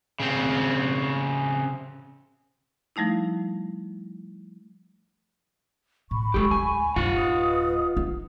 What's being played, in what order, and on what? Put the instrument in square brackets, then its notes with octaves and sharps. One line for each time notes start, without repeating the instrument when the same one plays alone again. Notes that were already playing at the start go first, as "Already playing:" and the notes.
[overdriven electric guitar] C#3 C4
[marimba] F3 G3 A3 D#4 E4
[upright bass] A2 [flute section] B5 C#6
[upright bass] G3 G#3 [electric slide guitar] G4 A4
[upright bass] D2 [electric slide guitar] G#5
[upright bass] D1 F#2 [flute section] D4 C5 [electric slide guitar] F4 F5 F#5
[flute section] B4 D#5 D#6
[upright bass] D#4